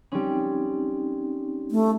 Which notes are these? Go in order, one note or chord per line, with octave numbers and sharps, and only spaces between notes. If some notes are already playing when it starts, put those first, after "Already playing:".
G3 C4 C#4 D#4
A3